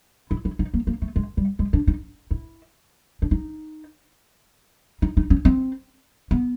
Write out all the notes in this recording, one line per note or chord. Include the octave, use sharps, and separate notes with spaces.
E4
E4
D#4
A#3
A#3
A3
G#3
G3
G#3
D4
D#4
E4
D4
D#4
D#4
D#4
C#4
C4
B3